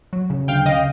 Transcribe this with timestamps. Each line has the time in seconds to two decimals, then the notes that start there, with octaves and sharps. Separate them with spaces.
0.13 F#3
0.30 C#3
0.48 D2 F5 G5
0.65 C#3 D#5 F5